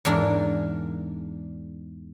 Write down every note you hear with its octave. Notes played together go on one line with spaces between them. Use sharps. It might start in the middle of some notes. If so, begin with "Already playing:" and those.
E2 G#2 D4 A#4